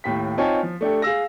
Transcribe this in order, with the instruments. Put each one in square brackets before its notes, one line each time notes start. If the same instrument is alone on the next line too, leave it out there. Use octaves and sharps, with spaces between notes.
[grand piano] D#2 A2 G5 B6
C4 D#4 F4 C#5 G#5 A5
F3
A3 D4 G4 A4
G#4 F5 E6 A#6